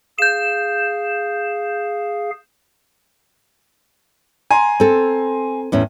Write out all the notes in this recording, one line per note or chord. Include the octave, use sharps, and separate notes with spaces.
G#4 F5 G6 E7
G#5 A#5 C6
C4 A4
E2 A2 C#4